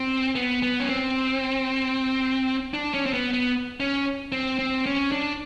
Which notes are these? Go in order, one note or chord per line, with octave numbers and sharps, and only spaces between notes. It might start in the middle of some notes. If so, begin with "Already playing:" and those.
Already playing: C4
B3
B3
C#4
C4
D4
C#4
C4
B3
B3
C#4
C4
C4
C#4
D4